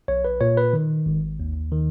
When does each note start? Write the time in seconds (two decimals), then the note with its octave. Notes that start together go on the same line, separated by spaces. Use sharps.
0.08 B1 C#5
0.25 B4
0.41 A#2 C#5
0.57 B4
0.73 D#3
1.06 G#1
1.40 D#2
1.72 D#3